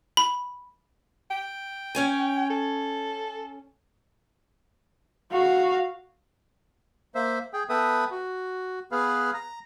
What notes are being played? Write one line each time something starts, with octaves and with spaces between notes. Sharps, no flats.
B5
G5
C#4 C#5 G#5
A4
F#4 F5
A#3 C5 E5
G#4 G5
B3 A4 B4 E5 G5 D#6
F#4
B3 G#4 B4 F5
A#5